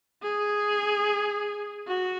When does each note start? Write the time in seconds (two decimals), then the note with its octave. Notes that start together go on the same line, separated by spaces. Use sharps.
0.23 G#4
1.88 F#4